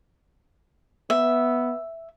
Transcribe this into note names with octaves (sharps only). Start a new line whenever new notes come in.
B3 E5